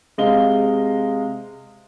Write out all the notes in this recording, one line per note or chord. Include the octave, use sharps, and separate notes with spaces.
C3 G#3 D#5 F5 G7